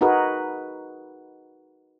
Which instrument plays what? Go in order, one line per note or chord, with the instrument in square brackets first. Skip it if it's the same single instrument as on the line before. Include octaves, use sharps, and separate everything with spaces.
[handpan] D#4 F#4 G#4 A#4 B4